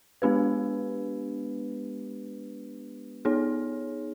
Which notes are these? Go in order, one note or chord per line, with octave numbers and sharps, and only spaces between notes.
G#3 B3 D4 G4 B4
B3 D#4 G#4 C#5